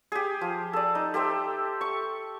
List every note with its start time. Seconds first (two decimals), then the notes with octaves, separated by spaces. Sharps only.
0.12 G4 G#4
0.41 F3
0.73 A4 D5
0.95 D#4
1.14 G4 A4 C5 E5
1.81 C#6